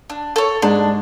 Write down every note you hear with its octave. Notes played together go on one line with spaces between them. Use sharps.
D4
A4 C#5
G#2 D4